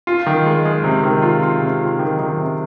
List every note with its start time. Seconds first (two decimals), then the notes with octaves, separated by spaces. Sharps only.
0.07 F4
0.26 D#3
0.46 G#3
0.65 G#3
0.84 C3
1.03 D#3
1.22 F4
1.43 F4
1.61 C3
1.81 F4
1.99 D#3
2.19 D#3
2.38 C3